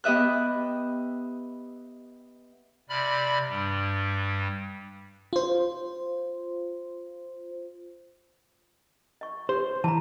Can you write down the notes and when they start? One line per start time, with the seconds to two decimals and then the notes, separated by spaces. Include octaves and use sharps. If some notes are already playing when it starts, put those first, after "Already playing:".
0.04 B3 G4 D#5 E5 F#6
2.89 C3 D5 B5 F6
3.49 G2 G3
5.33 F4 C5
9.21 D#5 C#6
9.49 G4 C5
9.84 E3 A5 A#5